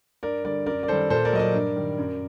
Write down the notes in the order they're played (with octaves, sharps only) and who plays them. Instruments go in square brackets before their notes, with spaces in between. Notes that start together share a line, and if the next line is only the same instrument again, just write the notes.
[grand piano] G2 A#4 D5
D3 G3 A#4 D5
F#2 A#4 D5
D5
D#3 G3 A4 C5
A#2 A4 C5
A#4 D5
F#3 D#5
A#4 D5
G2
D#3 G3
F#2